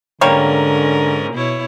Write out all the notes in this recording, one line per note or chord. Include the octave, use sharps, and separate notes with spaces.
G#2 D3 G3 A#3 C#4 A#4 C#5
B2 E4 C#5